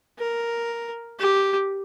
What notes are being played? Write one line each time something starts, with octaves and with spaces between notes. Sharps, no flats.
A#4
G4